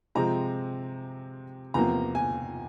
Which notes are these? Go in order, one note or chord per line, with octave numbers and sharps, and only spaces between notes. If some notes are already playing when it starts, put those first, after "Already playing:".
C3 F3 G#3 C4 A#5
E2 C3 F3 A#3 A#5
G#5